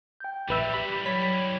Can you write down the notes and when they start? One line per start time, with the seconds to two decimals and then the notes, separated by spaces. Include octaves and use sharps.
0.20 G5 G6
0.49 A#1 E3 G3 B4 E5
0.74 G4 B5
1.06 F#3 C#5 B5 G#6 B6